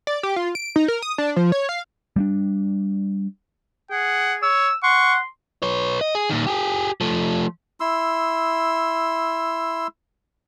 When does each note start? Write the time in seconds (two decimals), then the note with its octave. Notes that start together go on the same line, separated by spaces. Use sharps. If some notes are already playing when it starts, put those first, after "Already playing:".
0.07 D5
0.23 G4
0.36 F4
0.55 D7
0.76 D#4
0.88 A#4
1.02 D#6
1.18 D4
1.36 F3
1.52 C#5
1.69 F5
2.16 G3 A3 D4
3.91 G#4 F#5
4.42 C#5 E6
4.83 F#5 C6 C#6
5.63 B4 C#5
6.01 D#5
6.15 G#4
6.29 A#2 D#3
6.47 G4 G#4
7.01 F3 A3
7.80 E4 C6 E6